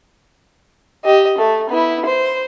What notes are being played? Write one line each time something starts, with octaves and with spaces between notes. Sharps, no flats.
G4 D#5
A3
B3 E4
C5